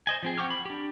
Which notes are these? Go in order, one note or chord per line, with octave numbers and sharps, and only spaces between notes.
C5 D#5 G#5
F3 C4 G#4
F#5 G5 C#6 D6 F6
B5
D4 G4